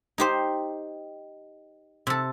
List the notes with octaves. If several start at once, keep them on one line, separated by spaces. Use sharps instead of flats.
D#4 G4 C5
C3 A4